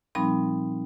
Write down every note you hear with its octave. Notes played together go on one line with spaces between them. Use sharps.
A#2 F3 G3 C4 D#4 B5